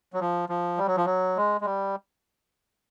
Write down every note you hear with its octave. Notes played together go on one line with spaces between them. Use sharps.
F#3
F3
F3
G3
F#3
F3
F#3
G#3
G#3
G3